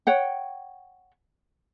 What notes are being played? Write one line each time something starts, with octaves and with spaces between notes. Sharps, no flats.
C#5 F#5 G5